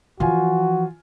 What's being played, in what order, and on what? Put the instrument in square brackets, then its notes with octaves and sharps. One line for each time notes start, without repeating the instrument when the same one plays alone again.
[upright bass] E3 F3 [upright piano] F4 G#5 [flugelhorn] F#4